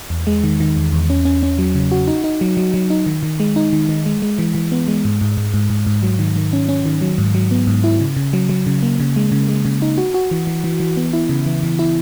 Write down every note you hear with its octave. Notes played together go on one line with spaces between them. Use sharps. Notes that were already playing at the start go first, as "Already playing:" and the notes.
E2
G#3
D#3
D#3
E2
E2
C#4
C#4
C#4
F#3
C#3
F#4
D#4
D#4
F#3
F#3
F#3
D#4
D#3
D#3
G#3
D#4
D#3
D#3
G#3
G#3
E3
E3
B3
G#3
G#2
G#2
G#2
G#2
G#2
G#2
F#3
D#3
D#3
C#4
C#4
D#3
F#3
G#2
F#3
B3
G#2
E4
C#3
C#3
F#3
F#3
C#3
A#3
C#3
G#3
C#3
G#3
C#3
D#4
F#4
F#4
E3
E3
E3
E3
B3
E4
C#3
E3
E3
E4